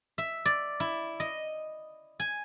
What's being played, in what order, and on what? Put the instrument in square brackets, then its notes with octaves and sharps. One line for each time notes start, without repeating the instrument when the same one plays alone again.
[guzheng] E5
D5
E4
D#5
G#5